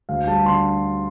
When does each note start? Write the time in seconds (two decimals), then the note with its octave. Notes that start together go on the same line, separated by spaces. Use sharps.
0.09 D2 F5
0.27 G3 A5
0.46 D3 C6